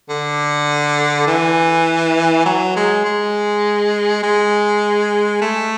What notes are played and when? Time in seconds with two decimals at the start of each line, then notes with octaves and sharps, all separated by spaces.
0.09 D3
1.27 E3
2.46 F#3
2.76 G#3
3.05 G#3
4.23 G#3
5.41 A3